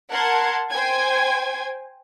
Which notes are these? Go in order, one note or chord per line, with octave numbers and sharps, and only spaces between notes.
A#4 F#5 A5 C6 G#6
C5 G5 G#5 G#6